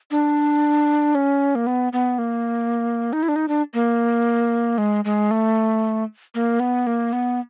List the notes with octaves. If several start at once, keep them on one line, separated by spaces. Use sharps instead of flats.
D4
C#4
A#3
B3
B3
A#3
D#4
E4
D4
D#4
D4
A#3
G#3
G#3
A3
A#3
B3
A#3
B3